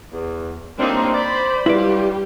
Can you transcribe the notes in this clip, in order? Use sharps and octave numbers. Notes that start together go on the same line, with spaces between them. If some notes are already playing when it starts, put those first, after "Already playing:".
E2
A2 G3 A#3 C4 D4 D#4
C5 D5 B5
F#3 G3 D4 E4 F4 G4 B4 D5